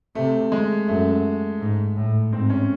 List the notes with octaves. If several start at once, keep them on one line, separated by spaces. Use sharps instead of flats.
C3 A3
G#3
F#2 A3
G#2
A2
G#2 C4
C#4